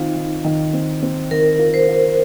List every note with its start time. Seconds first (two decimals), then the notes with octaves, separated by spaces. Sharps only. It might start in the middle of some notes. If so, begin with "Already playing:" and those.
Already playing: D#3 C4 D#4 F4
0.16 D#3
0.45 D#3
0.73 C4
1.02 C4
1.31 D#3 A#4
1.59 F4
1.74 C5
1.88 F4